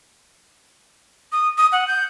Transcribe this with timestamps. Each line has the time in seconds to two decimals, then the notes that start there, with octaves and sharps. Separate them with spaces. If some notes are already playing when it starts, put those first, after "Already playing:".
1.32 D#6
1.58 D#6
1.72 F#5
1.88 G6